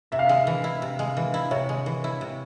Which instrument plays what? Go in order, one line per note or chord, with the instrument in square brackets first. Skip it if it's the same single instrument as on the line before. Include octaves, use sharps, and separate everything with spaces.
[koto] C3 [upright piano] E5
[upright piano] F5
[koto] G#3 [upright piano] E5
[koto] E3
E4
C3
G#3
E3
E4
[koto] C3 [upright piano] C#5
[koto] G#3
E3
E4
C3